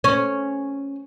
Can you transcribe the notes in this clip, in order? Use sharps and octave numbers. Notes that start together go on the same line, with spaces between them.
C#4